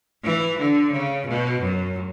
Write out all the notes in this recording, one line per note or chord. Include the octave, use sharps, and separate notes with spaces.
E3
D3
C#3
B2
F#2